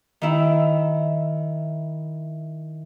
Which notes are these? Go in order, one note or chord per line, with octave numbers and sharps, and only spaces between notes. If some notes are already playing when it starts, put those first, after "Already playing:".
D#3 E4